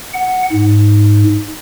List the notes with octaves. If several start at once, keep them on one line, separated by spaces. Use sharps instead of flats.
F#5
G#2